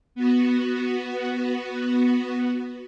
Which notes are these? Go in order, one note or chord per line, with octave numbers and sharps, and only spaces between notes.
B3 F#4